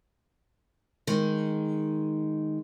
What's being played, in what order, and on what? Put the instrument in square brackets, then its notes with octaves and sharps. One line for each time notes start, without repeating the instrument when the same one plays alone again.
[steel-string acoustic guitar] D#3 G#3